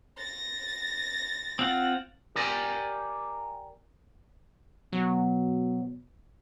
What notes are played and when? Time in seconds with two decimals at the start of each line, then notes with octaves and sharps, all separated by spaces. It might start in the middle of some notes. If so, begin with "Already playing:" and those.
0.18 A6 A#6
1.59 C4 F4 F#5
2.35 G4 A#4 D5 G#5
4.92 B2 F#3